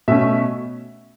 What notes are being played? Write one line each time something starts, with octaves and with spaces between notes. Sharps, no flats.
B2 A3 C#4 E5